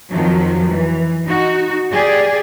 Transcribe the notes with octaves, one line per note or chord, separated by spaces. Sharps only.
F2 D#3 F3 F#3
E3
D#4 F#4
G4 G#4 D5